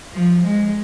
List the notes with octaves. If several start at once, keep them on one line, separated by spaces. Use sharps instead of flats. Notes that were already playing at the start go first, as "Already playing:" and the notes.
F3
G#3